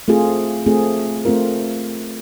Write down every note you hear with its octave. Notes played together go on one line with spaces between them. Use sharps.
A3 C4 F4 G#4
A3 C4 F4 G#4
A3 C4 F4 A#4